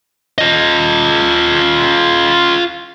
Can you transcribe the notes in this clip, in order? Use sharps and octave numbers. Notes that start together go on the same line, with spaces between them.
F4 D#5